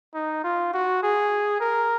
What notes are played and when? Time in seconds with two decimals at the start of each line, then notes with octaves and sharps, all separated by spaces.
0.14 D#4
0.44 F4
0.73 F#4
1.03 G#4
1.60 A#4